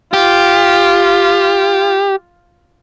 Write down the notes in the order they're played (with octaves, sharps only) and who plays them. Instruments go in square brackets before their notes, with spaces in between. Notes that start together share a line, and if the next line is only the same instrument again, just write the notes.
[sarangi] F4 [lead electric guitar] G4